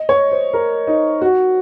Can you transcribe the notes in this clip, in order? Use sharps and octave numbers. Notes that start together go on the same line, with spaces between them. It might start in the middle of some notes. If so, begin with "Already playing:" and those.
Already playing: D#5
C#5
C5
A#4
D#4
F#4